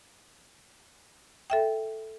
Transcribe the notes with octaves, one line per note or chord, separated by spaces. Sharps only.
A4 E5 G5